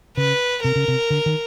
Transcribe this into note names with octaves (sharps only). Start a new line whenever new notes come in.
C#3 B4
C3 A#4
C#3
C3
D3
D#3